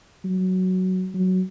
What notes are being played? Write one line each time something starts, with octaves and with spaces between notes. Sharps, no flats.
F#3
F#3